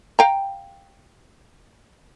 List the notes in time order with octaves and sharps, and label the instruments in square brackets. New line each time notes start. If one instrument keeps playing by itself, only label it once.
[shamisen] F5 G5 A#5